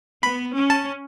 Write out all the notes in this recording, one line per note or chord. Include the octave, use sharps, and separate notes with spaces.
B3 B5
C#4
A5